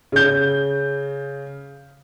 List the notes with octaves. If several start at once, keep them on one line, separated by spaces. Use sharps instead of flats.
C#3 G6